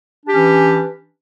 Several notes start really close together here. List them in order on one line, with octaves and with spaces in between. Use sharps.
D4 G4 C#4 E3